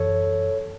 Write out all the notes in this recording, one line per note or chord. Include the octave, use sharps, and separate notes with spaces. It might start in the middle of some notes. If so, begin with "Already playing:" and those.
Already playing: F#2 E3 A4 C#5